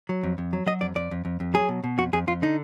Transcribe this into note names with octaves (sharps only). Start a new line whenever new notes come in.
F#3
F2
F2
F#3
F#3 D#5
F2 D5
F2 D5
F2
F2
F2
F#3 G#4
B2
B2
F2 F#4
F2 G#4
F2 F4
D3 D#4